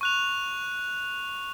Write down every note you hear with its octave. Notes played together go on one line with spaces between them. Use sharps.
C#6 F#6 F7